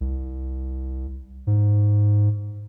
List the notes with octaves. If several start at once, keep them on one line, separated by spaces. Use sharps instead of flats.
C2
G#2